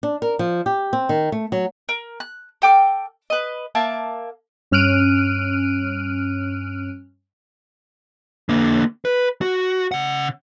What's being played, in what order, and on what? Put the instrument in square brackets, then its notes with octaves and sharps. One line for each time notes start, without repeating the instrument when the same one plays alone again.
[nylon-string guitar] D4
A#4
F3
G4
C4
D#3
A3
F#3
[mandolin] A#4
F#6
A4 G5 D6 F6
B4 D#5
A#3 E5 A5
[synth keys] G2 C#4 F6 F#6 D7 D#7
[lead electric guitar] D3 A#3
B4
F#4
C#3 F#5